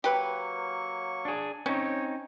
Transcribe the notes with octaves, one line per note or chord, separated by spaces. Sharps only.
F#3 A#3 G4 B4 C#6
D4 G#4
C4 C#4 D#4 C#5